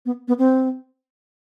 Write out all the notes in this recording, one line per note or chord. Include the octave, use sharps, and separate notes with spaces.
B3
B3
C4